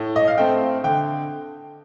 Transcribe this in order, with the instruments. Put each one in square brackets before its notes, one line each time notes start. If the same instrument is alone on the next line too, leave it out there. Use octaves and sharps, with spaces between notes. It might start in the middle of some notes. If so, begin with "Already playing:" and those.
Already playing: [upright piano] A2
D#5
F5
A3 C4 G5
D3 G5